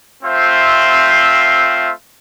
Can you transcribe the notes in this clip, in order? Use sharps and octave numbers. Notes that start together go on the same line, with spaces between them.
A3 C4 F4 C5 E5